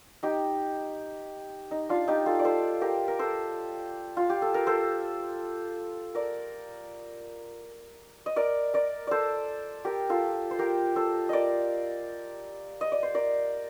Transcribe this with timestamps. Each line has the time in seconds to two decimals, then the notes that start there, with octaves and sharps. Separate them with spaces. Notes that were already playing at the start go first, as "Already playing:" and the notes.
0.23 D#4 G4
1.71 D#4
1.89 D4 F4
2.08 D#4 G4
2.26 F4 A4
2.39 D5
2.45 A4 C5
2.81 G4 A#4
3.08 A#4
3.19 A4 C5
4.17 F4
4.30 G4
4.42 A4
4.54 A#4
4.67 A4 C5
6.15 A#4 D5
8.26 D#5
8.36 A#4 D5
8.74 A#4 D5
9.07 A4 C5 D5
9.85 G4 A#4
10.09 F4 A4
10.51 C5
10.59 G4 A#4
10.96 A4 C5
11.29 A#4 D5 D#5
12.81 D#5
12.92 D5
13.03 C5
13.14 A#4 D5